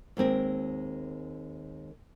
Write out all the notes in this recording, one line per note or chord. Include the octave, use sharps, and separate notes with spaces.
D#2 G#3 C4 A#4